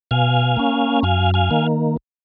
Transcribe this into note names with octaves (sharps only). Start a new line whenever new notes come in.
B2 F5 G#5
A#3 C#4
F#2 F5 G#5
F5 G#5
D#3 A#3